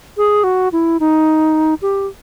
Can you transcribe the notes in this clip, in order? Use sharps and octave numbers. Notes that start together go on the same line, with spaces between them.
G#4
F#4
E4
D#4
G4